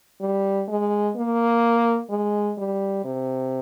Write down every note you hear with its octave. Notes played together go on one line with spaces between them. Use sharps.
G3
G#3
A#3
G#3
G3
C3